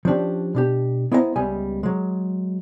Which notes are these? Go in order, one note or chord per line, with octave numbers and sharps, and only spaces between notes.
F3 C#4 D4 G4
B2 D4 G4
B3 E4 C5 D#5 E5 A#5
C#2 G3 B3 D#5 E5 G#5
F#3 G#3